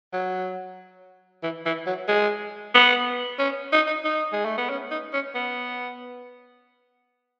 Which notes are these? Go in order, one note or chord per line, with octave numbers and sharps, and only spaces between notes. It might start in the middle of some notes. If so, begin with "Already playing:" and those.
F#3
E3
E3
F#3
G#3
B3
C#4
D#4
D#4
D#4
G#3
A3
B3
C#4
D#4
C#4
B3